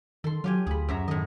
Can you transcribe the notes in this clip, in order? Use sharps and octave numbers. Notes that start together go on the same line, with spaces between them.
D#3 A4 C6
F#3 F4 G4 G#5
D2 G#4 B5
F#2 E5 A#5
A2 D#3 D#5